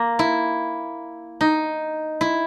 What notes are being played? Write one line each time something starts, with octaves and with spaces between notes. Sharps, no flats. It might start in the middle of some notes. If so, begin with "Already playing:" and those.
Already playing: A#3
E4
D#4
E4